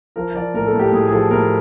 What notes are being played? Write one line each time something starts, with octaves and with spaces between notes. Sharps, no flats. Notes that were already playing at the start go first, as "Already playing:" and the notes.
F3 A#4
F3 D5
A2 A#4
A4
A2
G4
A2 G#4
G#4
F3 A4
A2 A#4